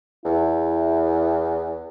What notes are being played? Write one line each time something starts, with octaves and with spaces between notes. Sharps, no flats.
E2 E4